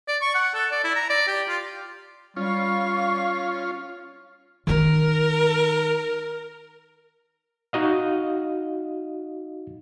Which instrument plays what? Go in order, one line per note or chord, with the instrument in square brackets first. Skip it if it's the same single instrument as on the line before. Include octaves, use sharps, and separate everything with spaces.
[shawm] D5
C#6
F#5
A4
D5
E4
A#5
D5
G4
F4
[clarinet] G3 [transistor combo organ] C#4 F4 [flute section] F5 C#6
[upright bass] D#3 D#4 [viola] A#4
[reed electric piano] D#4 F#4 D#5 F5